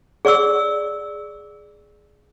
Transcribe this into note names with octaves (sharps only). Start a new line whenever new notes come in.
G#4 D5 C#6 E6